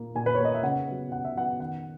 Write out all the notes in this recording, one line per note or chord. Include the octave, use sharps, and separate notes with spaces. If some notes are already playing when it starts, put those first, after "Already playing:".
Already playing: A#2 A#3
A#2 G#5
B4
C#5
A#3
D#5
E5
C#3 F#5
F#3 B3
C#3 F#5
E5
F#3 B3 F#5
D#3 F#5